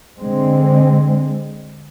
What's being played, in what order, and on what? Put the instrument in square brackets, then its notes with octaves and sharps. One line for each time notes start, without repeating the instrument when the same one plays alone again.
[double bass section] D3 G#3 C4